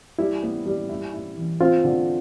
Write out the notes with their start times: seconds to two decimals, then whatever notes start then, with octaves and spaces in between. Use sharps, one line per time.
0.19 G3 E4
0.43 B3
0.66 G3
0.89 E4
1.14 E4
1.37 E3
1.60 C4 F4
1.84 D3